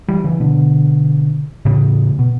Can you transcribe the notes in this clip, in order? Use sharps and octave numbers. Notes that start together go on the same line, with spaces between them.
E3 G3
C#3 E3
B2 D3
A2 C#3
B2